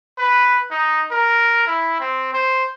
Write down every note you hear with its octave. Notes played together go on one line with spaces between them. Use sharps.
B4
D#4
A#4
E4
C4
C5